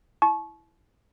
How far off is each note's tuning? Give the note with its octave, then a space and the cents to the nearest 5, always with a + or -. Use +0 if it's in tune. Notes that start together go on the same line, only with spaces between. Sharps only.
E4 +0 A5 -40 C#6 -15